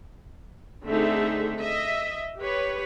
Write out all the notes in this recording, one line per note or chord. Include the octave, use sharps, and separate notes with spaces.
D3 A3 C4 D#4 G#4 E5
D#5 E5
G4 B4 C#5